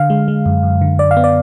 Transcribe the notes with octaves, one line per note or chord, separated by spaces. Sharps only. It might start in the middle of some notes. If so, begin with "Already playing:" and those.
Already playing: D3 F5
G#3
G#3
F#2
F#2
D3
F#2 D5
F5
B3
D5